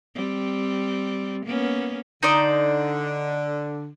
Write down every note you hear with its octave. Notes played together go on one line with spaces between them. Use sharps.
G3 C4
A#3 B3 C#4
D3 D#4 C5 D5